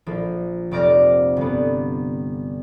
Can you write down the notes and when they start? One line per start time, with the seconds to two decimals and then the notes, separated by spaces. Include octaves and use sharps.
0.06 A#1 F3
0.71 F1 C4 D5 D6 F6 A#6
1.37 G1 B3